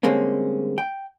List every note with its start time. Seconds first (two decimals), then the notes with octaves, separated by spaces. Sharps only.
0.03 D3 G3 G#3 A#3 C4 C#4
0.78 G5